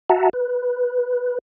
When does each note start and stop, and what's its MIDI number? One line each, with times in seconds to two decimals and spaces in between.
0.09 0.29 66
0.09 0.29 76
0.09 0.29 78
0.09 0.29 81
0.09 0.29 82
0.33 1.38 71